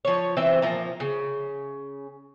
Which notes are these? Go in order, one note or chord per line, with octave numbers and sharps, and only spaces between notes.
F3 C#5
E3 C4 C5 E5
A#2 F3 A#5
C#3